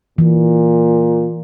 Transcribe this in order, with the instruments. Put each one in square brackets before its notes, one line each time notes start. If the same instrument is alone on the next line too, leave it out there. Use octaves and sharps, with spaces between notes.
[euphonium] A#2 [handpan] E3